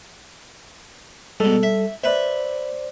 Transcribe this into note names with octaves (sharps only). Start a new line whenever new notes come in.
G#2 B2 G3 A4
E5
B4 C5 D5 E5